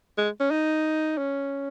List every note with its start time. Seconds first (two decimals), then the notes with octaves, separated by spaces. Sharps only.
0.18 G#3
0.40 C#4
0.51 D#4
1.18 C#4